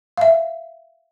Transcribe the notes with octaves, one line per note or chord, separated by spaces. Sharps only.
E5 F5